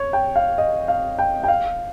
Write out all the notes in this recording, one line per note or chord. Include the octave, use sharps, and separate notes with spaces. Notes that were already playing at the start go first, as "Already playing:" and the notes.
Already playing: C#5
G5
F5
D#5
F5
G5
G5
F5